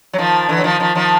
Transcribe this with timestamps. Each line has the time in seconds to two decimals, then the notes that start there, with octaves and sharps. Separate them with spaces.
0.13 F#3
0.18 D#3 F3
0.49 D3 E3
0.58 F#3
0.64 D#3 F3
0.80 D#3 F3
0.95 D#3 F3